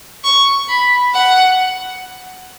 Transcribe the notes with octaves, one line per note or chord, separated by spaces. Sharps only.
C#6
B5
F#5